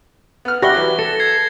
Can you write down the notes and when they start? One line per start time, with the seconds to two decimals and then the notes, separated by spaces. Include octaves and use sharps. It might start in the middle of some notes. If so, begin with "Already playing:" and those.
0.45 B3 F6
0.62 G4 D5 E5 F#5 B5 C#6 A#6 G7
0.74 E3 F#3
0.99 A4 C#7
1.20 G#6 C7